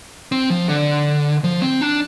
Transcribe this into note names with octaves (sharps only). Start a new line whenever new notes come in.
C4
F3
D3
F3
C4
D4